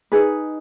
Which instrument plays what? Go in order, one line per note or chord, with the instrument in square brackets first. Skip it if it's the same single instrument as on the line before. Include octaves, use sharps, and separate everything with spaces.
[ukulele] D#4 G#4 B4